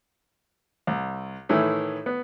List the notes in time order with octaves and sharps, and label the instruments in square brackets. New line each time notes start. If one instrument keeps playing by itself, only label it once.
[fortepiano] C2
A2 D#3 E3 E4
B3